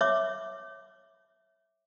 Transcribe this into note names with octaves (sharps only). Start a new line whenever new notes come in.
C#5 E5 D6